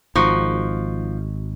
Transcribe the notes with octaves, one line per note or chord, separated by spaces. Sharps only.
G#1 F3 D#4 F#4